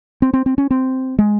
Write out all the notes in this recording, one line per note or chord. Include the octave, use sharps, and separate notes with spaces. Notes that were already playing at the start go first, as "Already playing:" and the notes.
C4
C4
C4
C#4
C4
G#3